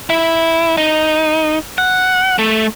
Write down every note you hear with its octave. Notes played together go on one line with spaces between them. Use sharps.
E4
D#4
F#5
A3